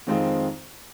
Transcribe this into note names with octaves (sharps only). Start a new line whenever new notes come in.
F2 D#3 G#3 C4 F4